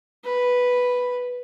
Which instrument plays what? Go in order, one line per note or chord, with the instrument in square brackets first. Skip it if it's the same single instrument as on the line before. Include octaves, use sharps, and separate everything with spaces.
[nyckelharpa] B4